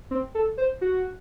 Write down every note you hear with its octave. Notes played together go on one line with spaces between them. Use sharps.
C4
A4
C5
F#4